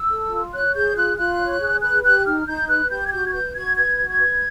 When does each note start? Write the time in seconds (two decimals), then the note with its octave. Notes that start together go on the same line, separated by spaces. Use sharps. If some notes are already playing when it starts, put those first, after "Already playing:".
Already playing: E6
0.10 A4
0.31 F4
0.53 C#5 F#6
0.74 G#4 G6
0.95 F4 F#6
1.17 F4 F#6
1.39 C#5
1.61 G#4
1.82 B4 F#6
2.03 G4 F#6
2.25 D#4 F6
2.47 D#4 G6
2.68 B4 F#6
2.90 G4 G6
3.06 G#6
3.12 F#4 G6
3.27 G#6
3.33 B4 G6
3.55 F#4 G#6
3.76 B4 G#6
3.98 F#4
4.09 G#6
4.20 B4